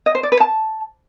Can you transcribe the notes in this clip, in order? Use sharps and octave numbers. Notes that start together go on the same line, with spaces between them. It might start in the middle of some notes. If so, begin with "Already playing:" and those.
D#5
C5
D5
B4
A5